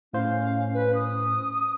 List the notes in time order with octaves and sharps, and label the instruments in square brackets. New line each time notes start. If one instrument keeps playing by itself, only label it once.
[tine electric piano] A2 C5 [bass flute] C#4 [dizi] F5
[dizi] B4
D#6